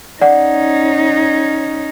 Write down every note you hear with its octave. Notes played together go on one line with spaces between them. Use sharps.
C#4 D#4 D5 F#5